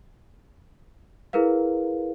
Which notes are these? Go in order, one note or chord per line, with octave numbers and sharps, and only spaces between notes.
E4 G#4 A#4 B4 F5